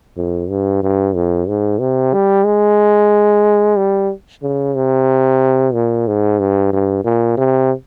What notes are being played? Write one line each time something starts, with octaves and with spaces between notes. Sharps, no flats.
F2
G2
G2
F2
G#2
C3
G3
G#3
G3
C#3
C3
A#2
G#2
G2
G2
A#2
C3